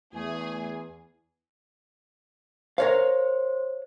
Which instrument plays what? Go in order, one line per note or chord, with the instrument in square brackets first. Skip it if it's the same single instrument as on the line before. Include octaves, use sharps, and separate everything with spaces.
[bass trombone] E2 [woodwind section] A3 [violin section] G#4
[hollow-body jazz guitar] A#4 C#5 F5 [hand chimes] C5